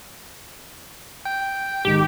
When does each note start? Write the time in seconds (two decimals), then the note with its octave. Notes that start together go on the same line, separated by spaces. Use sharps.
1.25 G5
1.85 G#2 D#3 G4